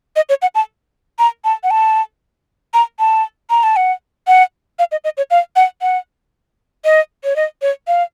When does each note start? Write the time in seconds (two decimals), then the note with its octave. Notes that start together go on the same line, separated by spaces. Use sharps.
0.16 D#5
0.29 C#5
0.42 F#5
0.55 A5
1.19 A#5
1.45 A5
1.64 F#5
1.71 A5
2.74 A#5
2.99 A5
3.50 A#5
3.63 A5
3.76 F#5
4.27 F#5
4.79 F5
4.92 D#5
5.04 D#5
5.17 C#5
5.31 F5
5.56 F#5
5.82 F#5
6.85 D#5
7.24 C#5
7.36 D#5
7.62 C#5
7.88 F5